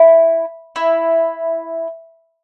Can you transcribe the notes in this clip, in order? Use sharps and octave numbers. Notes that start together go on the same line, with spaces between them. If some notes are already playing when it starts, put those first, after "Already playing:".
Already playing: E4
E4